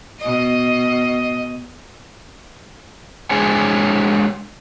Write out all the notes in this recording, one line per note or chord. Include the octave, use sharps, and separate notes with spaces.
B2 D#5
G#3 D4 G#4 C5 C#5 G#5